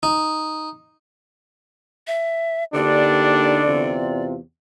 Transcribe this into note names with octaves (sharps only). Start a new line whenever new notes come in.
D#4
E5
D3 A#3 D4 D#4 G4 D5
E2 C3 F4